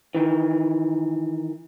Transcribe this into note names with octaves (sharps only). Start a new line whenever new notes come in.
D#3 E3